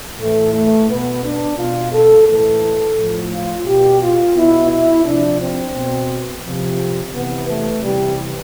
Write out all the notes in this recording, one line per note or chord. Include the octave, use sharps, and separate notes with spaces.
A2 E3 A3
A3
B2 B3
D4
B2 F4
A4
A2 E3 A4
A2 F3
F4
B2 G4
F4
B2 E4
E4
C3 F3 D4
C4
B2
F3
C3
C3 E3 B3
A3
C3 E3 G3